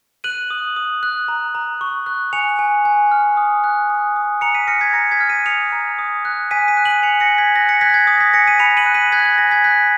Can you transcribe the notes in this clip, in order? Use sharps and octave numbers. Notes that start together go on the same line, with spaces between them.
F#6 D#7 F#7
D#6
D#6
F#6
A#5
A#5
C#6
F#6
G#5 C#7 F7
G#5
G#5
F6
D#6
F#6
D#6
D#6
A#5 C#7 F7
B6 D#7
F6 A#6 C#7
G#6 B6
A#5 A#6 C#7
G#6 B6
F6
B6 D#7
D#6 C#7 F7
A#5
D#6
F#6
G#5 B6 D#7
B6 D#7
F#6
D#7 F#7
G#5 C#7 F7
A#6 C#7
G#5
G#6 B6
F#6 A#6
A#6 C#7
F#6 G#6 B6
A#6
G#6
D#6 A#6
G#6 B6
G#5 A#6 C#7
B6 D#7
B5 C#7 F7
D#7 F#7
F#6
B6 D#7
F#6 G#6 B6
G#6
G#5 A#6
G#6 B6
F#6 G#6 B6